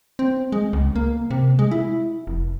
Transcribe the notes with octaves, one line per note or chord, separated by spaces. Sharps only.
C4
G#3
C#2
A#3
C3
G#3
E4
F1